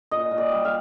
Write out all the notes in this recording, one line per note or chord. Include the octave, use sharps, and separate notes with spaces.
A#2 D#5
A#2
D5
G3
F5